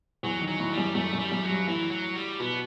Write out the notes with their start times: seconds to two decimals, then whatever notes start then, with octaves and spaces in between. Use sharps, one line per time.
0.23 E2 F#3
0.41 D#3
0.47 F#3
0.60 A2
0.72 G3
0.78 F#2
0.95 F#2 A3
1.13 F#2
1.19 G3
1.32 F#2
1.43 F#3
1.49 G2
1.67 A2 E3
1.91 F#3
2.15 G3
2.40 B2 B3